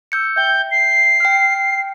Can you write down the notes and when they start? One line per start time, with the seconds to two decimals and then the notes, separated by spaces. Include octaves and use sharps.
0.12 E6 G6 C#7
0.36 E5 G5 G6
0.71 C7
1.20 G5 F6